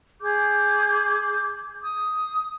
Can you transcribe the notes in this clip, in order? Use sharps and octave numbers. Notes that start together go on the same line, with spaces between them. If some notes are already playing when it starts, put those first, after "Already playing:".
G#4 D6 G6
D#6